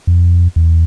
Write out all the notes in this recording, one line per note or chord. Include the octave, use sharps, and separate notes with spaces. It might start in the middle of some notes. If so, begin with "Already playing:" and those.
F2
E2